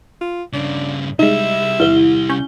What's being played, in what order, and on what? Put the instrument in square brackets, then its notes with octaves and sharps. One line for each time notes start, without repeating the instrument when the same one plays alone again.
[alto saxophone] F4
[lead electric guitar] G2 C#3 [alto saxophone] D4
[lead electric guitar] C2 G3 [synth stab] G#3 D#4 [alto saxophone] E5
[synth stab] E2 D#3 [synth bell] E4 G7
[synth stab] C#4 G6